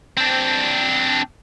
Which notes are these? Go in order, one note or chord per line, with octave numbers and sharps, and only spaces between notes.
C4 D4